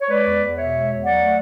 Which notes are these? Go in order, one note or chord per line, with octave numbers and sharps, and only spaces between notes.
C#5
G#3 B4 D5
E2
E2
B2 C#5 E5
G#3
E2
F#3 D5 F#5
A3